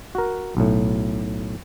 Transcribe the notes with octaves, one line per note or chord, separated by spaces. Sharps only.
F#4 A#4
B1 A2